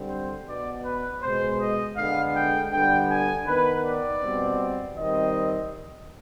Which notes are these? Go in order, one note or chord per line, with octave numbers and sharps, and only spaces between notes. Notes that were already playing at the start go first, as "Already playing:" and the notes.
Already playing: D3 G3 C4
C5
B2 B3 D5
B4
B2 G#3 B3 C5
D#5
D3 G#3 B3 F5
G5
D3 G3 B3 G5
G#5
D#3 B3 B4
D5
B2 G3 C4
D#3 G3 C4 D#5